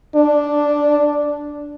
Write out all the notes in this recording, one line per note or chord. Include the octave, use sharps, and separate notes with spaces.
D4